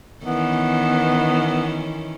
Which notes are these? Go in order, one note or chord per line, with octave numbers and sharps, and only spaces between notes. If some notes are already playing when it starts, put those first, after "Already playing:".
D#3 E3 B3 C#4